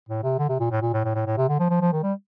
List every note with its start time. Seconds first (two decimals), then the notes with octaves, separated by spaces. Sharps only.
0.09 A2
0.23 C3
0.38 D3
0.49 C3
0.60 A#2
0.71 A2
0.82 A#2
0.93 A2
1.04 A2
1.15 A2
1.26 A2
1.37 C3
1.48 D3
1.60 F3
1.70 F3
1.81 F3
1.92 D#3
2.03 G3